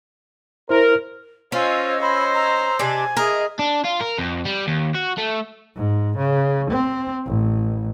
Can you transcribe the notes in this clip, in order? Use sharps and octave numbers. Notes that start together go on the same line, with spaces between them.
E4 A#4 C5
C#4 F4 C5 C#5 D#5 E6
C5 B5
A#5
C3 D4 G#5
G#4 A#4 D#5 E5
D4
F4
A#4
F2
G3
D#2
F#4
A3
G#2
C#3
C4
A1